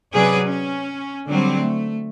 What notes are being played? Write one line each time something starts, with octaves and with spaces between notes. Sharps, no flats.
C3 F#3 C#4 G#4 B4 D5
C#4
D3 F#3 G3 C4
A3